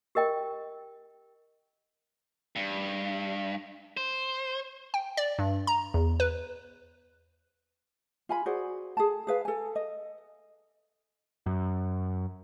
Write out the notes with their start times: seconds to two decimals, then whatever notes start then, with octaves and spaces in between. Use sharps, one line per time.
0.15 G4 A#4 D#5 G5
2.56 G2
3.97 C5
4.94 G5
5.17 D5
5.39 G2
5.67 A#5
5.94 E2
6.20 B4
8.29 F4 G#5 B5
8.46 F#4 G#4 C5 D5
8.97 G#4 A4 A5
9.27 G#4 B4 F5
9.45 A4 G#5
9.76 D#5
11.46 F#2